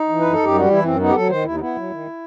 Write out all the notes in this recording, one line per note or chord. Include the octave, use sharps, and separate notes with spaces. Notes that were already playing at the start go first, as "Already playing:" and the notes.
Already playing: D#4
E3
F#2 B4
A4
F#2 G4
G3 F#4
E3 E4
F#2 C4
B3 D#4
G4
F#3 A4
D#3 C5
D#2 E4
D#4
B3 E4
F#3
D#3